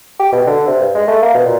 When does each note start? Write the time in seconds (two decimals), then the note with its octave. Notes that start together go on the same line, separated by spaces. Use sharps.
0.20 G4
0.32 B2
0.47 D3
0.67 C3
0.80 G2
0.95 G#3
1.08 A3
1.22 A#3
1.34 B2
1.46 A#2